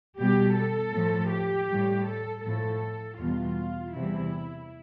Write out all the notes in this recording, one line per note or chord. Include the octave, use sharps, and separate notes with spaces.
B2 G3 G4
A4
A2 F3
G4
A2 G3
A4
A2 F3 A4
E2 B2 G3 F4
E2 C3 E3 G3 E4